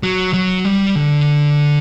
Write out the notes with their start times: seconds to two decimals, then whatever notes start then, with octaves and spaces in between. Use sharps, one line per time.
0.03 F#3
0.33 F#3
0.65 G3
0.95 D3